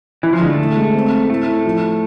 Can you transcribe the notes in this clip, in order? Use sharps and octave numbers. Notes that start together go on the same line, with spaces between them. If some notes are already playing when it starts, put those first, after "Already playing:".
E3 E4
F3
D3 G#3
A3
E3
G#3
C4
C4
A2 A3
A2
F3